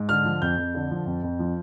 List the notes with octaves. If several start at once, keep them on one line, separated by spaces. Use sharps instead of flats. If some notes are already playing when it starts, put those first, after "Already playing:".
Already playing: G#2
D3 F6
F3
F2 G6
F2
D3
F3
F2
F2
F3